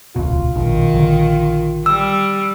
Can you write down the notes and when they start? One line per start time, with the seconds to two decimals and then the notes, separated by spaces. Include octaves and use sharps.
0.16 D#1 C#2 B2 F4
0.56 A#1 B2 D#3
0.94 A#1 D3 E3
1.86 G3 E6